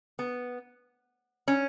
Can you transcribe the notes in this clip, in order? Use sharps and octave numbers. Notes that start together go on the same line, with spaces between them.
B3
C#4